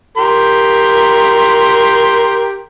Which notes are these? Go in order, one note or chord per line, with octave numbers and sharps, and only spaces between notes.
G4 A#4 C6